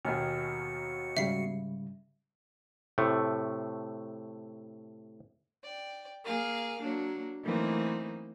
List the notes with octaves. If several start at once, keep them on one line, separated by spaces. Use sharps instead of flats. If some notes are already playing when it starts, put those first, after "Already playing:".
D#2 B2 D#3 B3 F#4 G#5 F6 C#7
G#2 C#3 G3 E5 C7
A2 C3 A3
D5 G5
A#3 G#4 A#4 F5
F#3 A#3 D4
E3 F#3 A3 A#3 C4 D#4